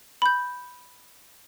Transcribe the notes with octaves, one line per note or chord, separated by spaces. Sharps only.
B5 G6